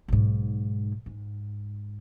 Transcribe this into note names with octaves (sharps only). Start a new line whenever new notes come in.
B1 G#2
G#2